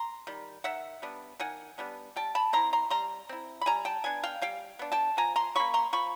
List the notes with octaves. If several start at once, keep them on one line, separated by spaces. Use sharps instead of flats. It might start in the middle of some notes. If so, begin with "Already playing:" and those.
Already playing: A#5 C6
D#3 G3
D#3 E5 F#5
G3 B3 D4
D#3 F#5 G#5
G3 B3 D4
G3 G5 A5
A5 B5
C4 E4 A#5 C6
A#5 C6
G3 A#5 C6
C4 E4
B5
G3 G#5 A#5
G5 A5
B3 D4 G#5
F5 G5
G3 F5 G5
B3 D4
G5 A5
F3 G#5 A#5
A#5 C6
A#3 C#4 B5 C#6
A#5 C6
F3 B5 C#6